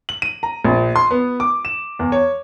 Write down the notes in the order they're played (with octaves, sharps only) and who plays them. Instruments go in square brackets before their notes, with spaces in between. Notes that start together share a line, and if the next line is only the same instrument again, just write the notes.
[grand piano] F#7
D#7
A#5
A#1
C6
B3
D6
E7
E2
C#5